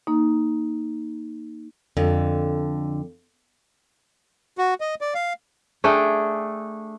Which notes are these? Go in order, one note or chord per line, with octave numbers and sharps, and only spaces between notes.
A#3 D#4
F2 D3
F#4
D#5
D5
F5
A3 D4 G#4 G5